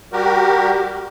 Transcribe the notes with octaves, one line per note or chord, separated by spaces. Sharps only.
G3 F#4 G4 A#4